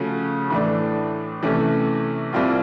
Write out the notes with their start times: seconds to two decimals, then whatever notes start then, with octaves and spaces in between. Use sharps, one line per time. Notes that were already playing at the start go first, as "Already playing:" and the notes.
Already playing: C#3 F3 A3 C#4 F#4
0.50 A2 E3 A3 D4
1.42 C3 E3 A3 C#4
2.33 C2 A#2 G3 C4 F4